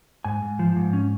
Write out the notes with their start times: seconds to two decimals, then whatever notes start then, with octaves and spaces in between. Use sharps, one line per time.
0.25 G#2 G#5
0.42 G#2
0.59 F3
0.76 G#2
0.93 C#4